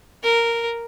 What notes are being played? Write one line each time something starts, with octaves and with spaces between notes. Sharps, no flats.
A#4